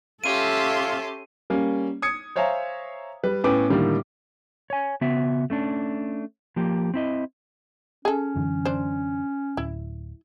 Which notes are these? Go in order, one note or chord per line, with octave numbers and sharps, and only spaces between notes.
C#4 F4 G4 A4 E5 F5 C6 D#7
G3 A#3 C#4
D#6 G#6 C#7
C5 C#5 E5 F5 G#5 A#5
G3 B4
A2 B3 C#4 B4 G5 D6
A2 D3 D#3 G3 A#3
C#5 G#5
C#3 B3 F#4 E5
A3 C#4 D4
F3 A#3 G4
C4 E4 D#5
C#4 G#4 A4
F#2 D3 E3
D4 C5
D1 E4